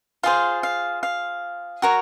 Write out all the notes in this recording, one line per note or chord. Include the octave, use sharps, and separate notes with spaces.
F4 G#4 C5 F5
F5
F5
F#4 A#4 C#5